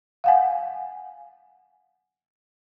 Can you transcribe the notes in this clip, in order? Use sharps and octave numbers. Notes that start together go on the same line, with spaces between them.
F5 F#5 G#5